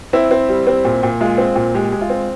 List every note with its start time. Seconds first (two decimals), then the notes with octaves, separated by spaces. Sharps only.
0.13 C4 E4
0.31 C4
0.49 G3
0.67 C4
0.85 A#2
1.03 A#2
1.21 G#3 F4
1.38 C4
1.56 A#2
1.75 G#3 G4
1.92 G#3
2.01 F4
2.10 C4